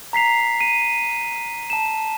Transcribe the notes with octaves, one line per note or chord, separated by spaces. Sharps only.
A#5 B6 C7 F7
D#7
A5 E7